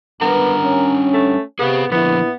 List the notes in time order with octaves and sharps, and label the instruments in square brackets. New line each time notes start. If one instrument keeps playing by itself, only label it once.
[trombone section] C#2 B3 B4 [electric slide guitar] G3 D4 F#5 [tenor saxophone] A#4
[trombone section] C#4
[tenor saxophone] A3
[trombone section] C3 [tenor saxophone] B3 [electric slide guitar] G#4 F5
[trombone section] A#1 A#2 E4 [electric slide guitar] D3 F3 [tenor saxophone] B3